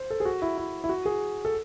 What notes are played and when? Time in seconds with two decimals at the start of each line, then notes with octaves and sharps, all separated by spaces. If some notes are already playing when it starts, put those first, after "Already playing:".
Already playing: C5
0.10 A4
0.20 G#4
0.25 F#4
0.42 E4
0.58 E4
0.84 E4
0.89 F#4
1.06 G#4
1.45 A4